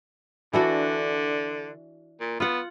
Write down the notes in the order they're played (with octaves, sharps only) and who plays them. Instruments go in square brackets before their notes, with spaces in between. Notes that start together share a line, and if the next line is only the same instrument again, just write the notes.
[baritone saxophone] D3 [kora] E3 D4 F#4
[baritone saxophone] A#2
[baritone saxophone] B3 [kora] F4 F#5